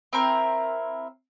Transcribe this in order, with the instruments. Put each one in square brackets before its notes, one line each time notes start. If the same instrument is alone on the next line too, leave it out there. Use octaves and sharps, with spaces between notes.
[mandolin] C4 E4 A#4